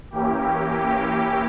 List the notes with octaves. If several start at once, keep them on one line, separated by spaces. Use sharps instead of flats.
E3 A#3 C#4 E4 G4
G4